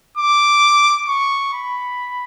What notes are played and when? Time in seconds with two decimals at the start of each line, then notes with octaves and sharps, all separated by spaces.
0.17 D6
1.08 C#6
1.54 B5